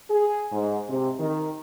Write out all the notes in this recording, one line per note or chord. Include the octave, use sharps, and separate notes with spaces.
G#4
G#2
C3
D#3